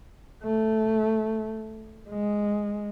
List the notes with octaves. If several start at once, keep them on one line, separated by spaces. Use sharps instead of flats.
A3
G#3